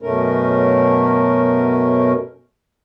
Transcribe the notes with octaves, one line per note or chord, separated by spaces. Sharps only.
F#2 B2 A3 C#4 A#4